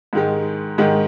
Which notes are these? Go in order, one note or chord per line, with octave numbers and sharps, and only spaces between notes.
G#2 D#3 G#3
G#2 D#3 G#3